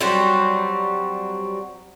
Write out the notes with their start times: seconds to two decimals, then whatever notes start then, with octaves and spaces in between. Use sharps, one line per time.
0.01 F#3 G3 C4 F#4